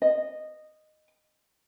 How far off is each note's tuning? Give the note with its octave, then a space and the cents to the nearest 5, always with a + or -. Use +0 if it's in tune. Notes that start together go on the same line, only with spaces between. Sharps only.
D#5 -10